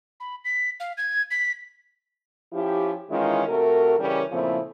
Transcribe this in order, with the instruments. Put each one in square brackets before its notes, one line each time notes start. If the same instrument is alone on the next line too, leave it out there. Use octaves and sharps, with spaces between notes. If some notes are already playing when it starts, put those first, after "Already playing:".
[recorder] B5
B6
F5
G#6
B6
[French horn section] F3 C#4 E4 G4
D#3 E3 G#3 C#4 E4 F4
C3 A3 F#4 A#4
C#3 E3 G3 C#4 G4 A#4
A#2 C#3 F3 A3 C4 E4